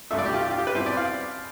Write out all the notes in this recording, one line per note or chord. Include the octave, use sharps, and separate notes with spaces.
C2 B2 A3 D4 F4 E5
D5
G4
F4
G4
F4
G4
B4
B2 G3 C4 E4 C5
D5
F5